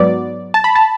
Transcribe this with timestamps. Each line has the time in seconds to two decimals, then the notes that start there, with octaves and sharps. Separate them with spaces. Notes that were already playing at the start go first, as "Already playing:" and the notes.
Already playing: G#2 F#3 B3 D5
0.54 A5
0.64 B5
0.75 A5